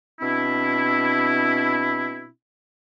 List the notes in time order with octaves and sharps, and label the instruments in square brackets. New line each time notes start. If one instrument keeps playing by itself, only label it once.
[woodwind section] B2 C4 D4 E4